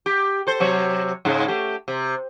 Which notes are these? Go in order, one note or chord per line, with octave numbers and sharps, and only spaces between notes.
G4
A4 C5
C3 F#3 C#5
G#2 C#3 G#3
A3 G4
C3